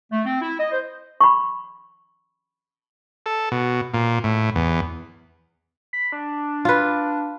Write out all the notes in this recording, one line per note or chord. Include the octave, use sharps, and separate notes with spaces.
A3
C4
E4
D#5
C5
B5 C#6
A4
B2
A#2
A2
E2
B5
D4
F4 B4